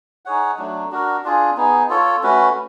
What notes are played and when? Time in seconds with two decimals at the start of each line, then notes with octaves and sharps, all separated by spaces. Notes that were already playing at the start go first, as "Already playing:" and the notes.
0.25 D#4 G#4 C#5 F#5
0.58 F#3 A3 D4
0.91 D4 F#4 A#4
1.24 D4 F4 G#4
1.57 B3 D#4 G#4
1.89 F4 A4 C#5
2.23 A3 C#4 F#4 B4